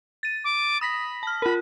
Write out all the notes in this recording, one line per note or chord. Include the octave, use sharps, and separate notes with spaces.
A6 D#7
D6
B5 D#6 A#6 B6
A5 F6
F4 A#4 B5